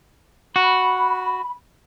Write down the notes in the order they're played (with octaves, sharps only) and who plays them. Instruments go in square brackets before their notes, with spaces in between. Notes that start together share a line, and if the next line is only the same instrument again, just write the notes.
[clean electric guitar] F#4 [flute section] B5